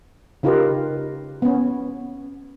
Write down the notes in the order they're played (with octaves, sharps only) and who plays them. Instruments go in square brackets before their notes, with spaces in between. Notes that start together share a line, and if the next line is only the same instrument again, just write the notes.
[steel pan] C#3 D#4 F4 G4 A#4 B4
B3 C#4